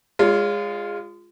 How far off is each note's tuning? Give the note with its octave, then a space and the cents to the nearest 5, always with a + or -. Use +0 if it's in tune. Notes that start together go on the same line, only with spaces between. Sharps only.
G#3 -20 F4 +0 C#5 +30